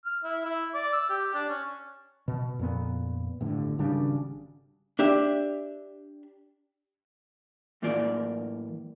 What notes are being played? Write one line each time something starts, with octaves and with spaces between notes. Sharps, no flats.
F6
E4
E4
D5
E6
G4
D4
C#4
B2
F2 A#2 B3
G1 A2 D3
G#1 C#3 G3 D4
D4 G4 E5
F#2 A2 E3 A#3 F4 D5